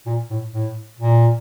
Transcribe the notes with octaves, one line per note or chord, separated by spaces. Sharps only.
A#2
A2
A2
A#2